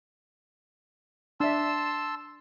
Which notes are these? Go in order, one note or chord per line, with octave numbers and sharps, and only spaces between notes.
D4 E5 A5 C6 E6